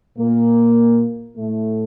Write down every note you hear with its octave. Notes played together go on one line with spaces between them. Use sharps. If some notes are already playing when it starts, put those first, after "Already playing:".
A#2 A#3
A2 A3